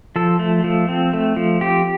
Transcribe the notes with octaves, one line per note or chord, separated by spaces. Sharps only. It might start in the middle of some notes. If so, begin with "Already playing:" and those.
F3 A4
A3
F3
C4
A3
F3
C4 G4